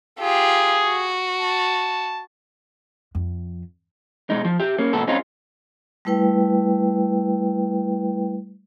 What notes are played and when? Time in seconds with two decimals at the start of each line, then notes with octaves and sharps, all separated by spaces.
0.19 F4 G4 G#4
0.84 F#4
1.40 A5
3.15 F2
4.30 B2 G#3 D#4
4.45 F3
4.60 G4 E5
4.78 A#3 C#4
4.93 C#2 A#2 B3 A4
5.07 G#3 C4 C#4 D#4 F4
6.05 G3 A3 E4 B4 G5